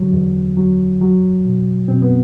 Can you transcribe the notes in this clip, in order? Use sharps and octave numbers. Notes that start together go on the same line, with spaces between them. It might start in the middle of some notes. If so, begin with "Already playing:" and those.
Already playing: D3 F#3
E2
F#3
F#3
B2
B2 C4
B3